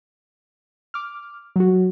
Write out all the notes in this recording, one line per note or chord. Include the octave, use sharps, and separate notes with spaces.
D6 F6
F#3 F#4